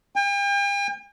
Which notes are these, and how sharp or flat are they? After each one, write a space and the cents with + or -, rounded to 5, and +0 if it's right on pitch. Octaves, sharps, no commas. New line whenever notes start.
G5 +45